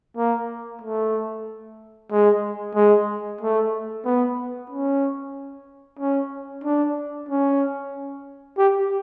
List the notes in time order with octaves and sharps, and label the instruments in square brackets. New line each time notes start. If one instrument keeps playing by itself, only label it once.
[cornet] A#3
A3
G#3
G#3
A3
B3
C#4
C#4
D4
C#4
G4